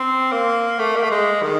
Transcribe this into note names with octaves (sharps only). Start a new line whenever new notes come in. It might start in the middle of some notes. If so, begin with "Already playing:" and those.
Already playing: C4
A#3
A3
A#3
A3
G#3
D#3